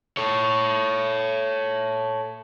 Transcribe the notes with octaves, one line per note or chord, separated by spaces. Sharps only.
A4 C#5